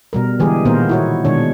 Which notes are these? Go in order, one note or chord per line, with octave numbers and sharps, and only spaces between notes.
B2 G3 A#4
D3 E3 G3 G#3 G4 G#4
A#2 D#3 A#3 B3 A#4 C5
E4 F#4 C#5
B2 D#3 G#3 D4 C#5